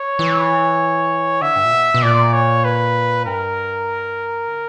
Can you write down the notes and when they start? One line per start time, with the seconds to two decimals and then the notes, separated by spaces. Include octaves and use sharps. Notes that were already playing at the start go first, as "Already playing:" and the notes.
Already playing: C#5
0.19 E3
1.41 D3 E5
1.56 G2
1.65 A#2
1.72 B2
1.94 B2
2.02 A#2 D5
2.33 C#5
2.64 B4
3.25 G2 A#4
4.48 C#3